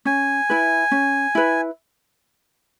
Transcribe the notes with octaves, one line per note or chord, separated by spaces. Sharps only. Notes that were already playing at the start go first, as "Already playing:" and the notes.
C#4 G#5
E4 B4
C#4
E4 B4